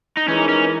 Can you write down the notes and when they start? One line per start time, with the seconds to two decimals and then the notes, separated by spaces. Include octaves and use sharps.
0.17 D#4
0.28 E3 G#3 C#4 D#4 A#4
0.49 C#4